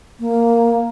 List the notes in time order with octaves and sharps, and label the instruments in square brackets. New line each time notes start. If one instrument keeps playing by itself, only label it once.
[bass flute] A#3